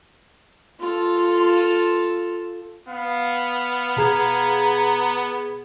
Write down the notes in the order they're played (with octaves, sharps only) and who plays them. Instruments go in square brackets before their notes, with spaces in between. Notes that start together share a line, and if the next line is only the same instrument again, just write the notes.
[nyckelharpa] F4 A4
[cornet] B3 [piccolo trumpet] F5
[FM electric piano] B2 G#4 G#6 [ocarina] A#5